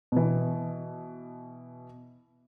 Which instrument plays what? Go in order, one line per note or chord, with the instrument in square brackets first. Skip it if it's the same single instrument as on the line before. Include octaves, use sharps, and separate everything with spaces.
[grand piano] B2 E3